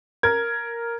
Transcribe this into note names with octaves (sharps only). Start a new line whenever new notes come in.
A#4 G#6